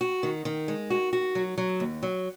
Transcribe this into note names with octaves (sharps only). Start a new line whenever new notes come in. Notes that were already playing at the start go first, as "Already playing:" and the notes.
F#4
D#3
D#3
G#3
F#4
F#4
F#3
F#3
D#2
F#3